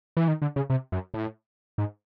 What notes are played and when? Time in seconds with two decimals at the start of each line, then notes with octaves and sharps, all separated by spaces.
0.17 E3
0.28 D#3
0.42 D3
0.56 C#3
0.70 C3
0.92 F#2
1.14 A2
1.78 G#2